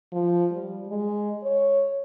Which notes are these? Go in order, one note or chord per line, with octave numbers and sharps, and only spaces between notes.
F3
G3
G#3
C#5